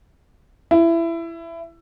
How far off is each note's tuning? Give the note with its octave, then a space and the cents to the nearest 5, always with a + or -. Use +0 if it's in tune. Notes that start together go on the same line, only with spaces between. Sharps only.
E4 +20